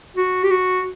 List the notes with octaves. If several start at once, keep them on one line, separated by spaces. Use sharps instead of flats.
F#4
G4
F#4